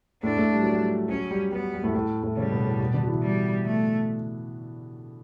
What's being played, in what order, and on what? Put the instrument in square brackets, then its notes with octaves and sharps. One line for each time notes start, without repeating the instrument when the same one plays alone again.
[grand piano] A2 A3 [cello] D4
[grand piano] A2 A3
G3
F#3
G3
[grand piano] F#3 [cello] C#4
[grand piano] G3
[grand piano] G3 [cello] B3
[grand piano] G3
A2 A3
A2 A3
A2 A3
[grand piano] C#3 C#4 [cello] G3
[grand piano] B2 B3
A2 A3
B2 B3
D3 D4
F#4
E3 E4
[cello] G3
A3